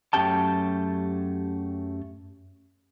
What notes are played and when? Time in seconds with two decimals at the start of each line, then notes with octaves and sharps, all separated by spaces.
0.13 F#2 A3 C#4 G4 G5 A5